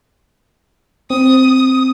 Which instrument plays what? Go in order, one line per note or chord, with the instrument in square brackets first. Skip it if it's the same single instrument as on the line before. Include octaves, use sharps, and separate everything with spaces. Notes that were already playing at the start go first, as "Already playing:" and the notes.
[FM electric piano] C4 [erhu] D#6